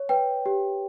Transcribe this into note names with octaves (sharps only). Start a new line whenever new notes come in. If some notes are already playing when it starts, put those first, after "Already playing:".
Already playing: C#5
B4 G5
G4